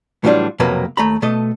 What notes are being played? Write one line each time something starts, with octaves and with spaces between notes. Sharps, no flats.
A2 E3 F#3 G3 D4 F4
B1 F2 C3 F#3 A#3 B4
D#2 A3 A#5 B5
B2 A3 A4 D#5